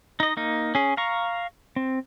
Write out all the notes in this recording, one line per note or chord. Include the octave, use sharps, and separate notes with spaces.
D#4 D#5
A#3 D#4
C#4 G#4
F5 A#5 C#6
C4